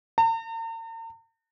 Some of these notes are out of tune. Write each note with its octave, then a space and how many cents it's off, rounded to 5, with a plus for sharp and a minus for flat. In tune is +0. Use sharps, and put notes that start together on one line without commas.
A#5 -45